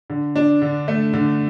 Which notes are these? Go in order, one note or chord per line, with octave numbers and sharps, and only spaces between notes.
D3
D4
D3
A3
D3